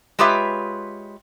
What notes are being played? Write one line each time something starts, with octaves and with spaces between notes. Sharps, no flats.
G#3 F4 G4 B4 C#5 E5